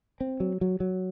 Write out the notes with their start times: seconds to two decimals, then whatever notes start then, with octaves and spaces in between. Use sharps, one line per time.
0.21 C4
0.40 F#3
0.61 F#3
0.80 F#3